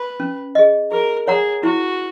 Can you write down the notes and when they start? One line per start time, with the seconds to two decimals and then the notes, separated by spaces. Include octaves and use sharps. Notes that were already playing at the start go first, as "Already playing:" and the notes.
Already playing: B4
0.20 C#4
0.55 G#4 D#5
0.92 G#4 A#4
1.28 G#4 C#5 F#5 A#5
1.63 E4 F#4